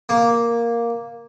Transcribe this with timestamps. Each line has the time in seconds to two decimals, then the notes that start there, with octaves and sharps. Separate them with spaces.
0.09 A#3